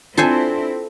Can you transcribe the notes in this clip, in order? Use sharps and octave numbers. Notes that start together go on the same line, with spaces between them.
C4 D4 E4 F4 A4 C5 G#5 A5